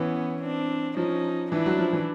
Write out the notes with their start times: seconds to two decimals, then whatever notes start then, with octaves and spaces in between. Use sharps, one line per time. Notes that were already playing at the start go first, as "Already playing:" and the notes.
Already playing: E3 B3 C#4
0.42 C4 D4
0.97 F3 C#4 D#4
1.51 E3 D4 E4
1.66 F#3
1.79 F3
1.93 E3